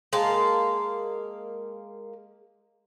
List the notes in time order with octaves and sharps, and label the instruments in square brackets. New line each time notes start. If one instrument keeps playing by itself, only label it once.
[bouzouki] G#3 A#3 A5